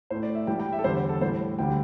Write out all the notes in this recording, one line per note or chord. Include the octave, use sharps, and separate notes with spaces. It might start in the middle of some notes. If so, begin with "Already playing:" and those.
A2 A3 C5
D5
E5
G2 E3 G3 G5
G5
E5
A4
E2 D3 G3 C5
A4
A2 G3 C5
D2 D3 G3 G5